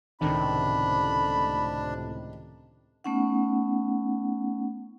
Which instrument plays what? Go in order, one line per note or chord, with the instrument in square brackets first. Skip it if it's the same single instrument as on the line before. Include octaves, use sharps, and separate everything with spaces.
[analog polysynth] C#2 A2 C3 [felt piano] D#3 [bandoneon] D4 [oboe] B5
[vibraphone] A3 B3 C#4 D#4 F#5